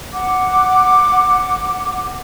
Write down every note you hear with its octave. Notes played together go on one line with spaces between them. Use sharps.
F#5 D6